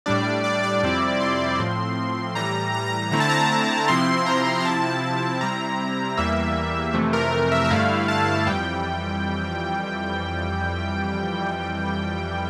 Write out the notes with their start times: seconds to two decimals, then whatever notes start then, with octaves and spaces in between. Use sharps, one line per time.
0.06 A2 G3 D4 D5
0.44 D5
0.63 D5
0.83 F2 C3 G3 C4 E4
1.21 C6
1.59 A2 F3 C4
2.35 A2 E3 G3 A#5
2.74 A#5
2.86 A#5
3.11 D3 A3 C4 E4 A#5
3.20 A5
3.30 A#5
3.88 C3 F3 C4 E4 C6
4.26 A#5
4.60 A#5
4.65 C3 F3 C4 E4 A5
5.41 C3 G3 C4 E4 A#5
6.17 E2 E3 G3 A#3 E5
6.94 F2 C3 E3 A3
7.13 A#4
7.52 E5
7.65 E5
7.70 G2 D3 A3 E4 F5
8.08 A5
8.47 F2 E3 G3 G5